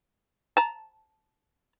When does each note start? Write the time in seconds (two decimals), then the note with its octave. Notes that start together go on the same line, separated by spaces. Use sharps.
0.57 A5 A#5